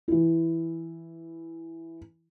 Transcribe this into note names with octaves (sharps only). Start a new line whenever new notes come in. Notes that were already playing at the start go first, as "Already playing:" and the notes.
E3 E4